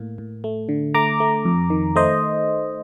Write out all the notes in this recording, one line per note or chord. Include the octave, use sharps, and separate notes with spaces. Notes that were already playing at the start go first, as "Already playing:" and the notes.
Already playing: A2 A#3
A2
A3
D3
A3 A#5 D6
A3
F2
D#3
A3 C5 D#5